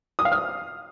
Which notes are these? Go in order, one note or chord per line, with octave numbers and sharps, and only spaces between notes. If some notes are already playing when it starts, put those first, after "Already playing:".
D#6
F5
F6